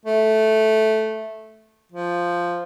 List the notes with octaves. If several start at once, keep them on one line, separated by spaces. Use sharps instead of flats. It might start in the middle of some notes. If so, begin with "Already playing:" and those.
A3
F3